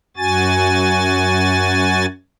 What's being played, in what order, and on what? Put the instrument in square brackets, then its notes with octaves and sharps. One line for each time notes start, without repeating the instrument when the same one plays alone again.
[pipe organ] F#2 F#4 G#5 A6